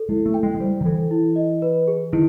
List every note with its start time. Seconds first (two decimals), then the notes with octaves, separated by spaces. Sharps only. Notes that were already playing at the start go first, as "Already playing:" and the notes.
Already playing: A4
0.09 G#3 E4
0.26 A3
0.34 G5
0.43 G#3
0.55 G#3
0.60 G3 C5
0.81 D#3
0.85 E3 A4
1.11 E4
1.36 D#5
1.62 B4
1.88 G#4
2.13 D#3 E4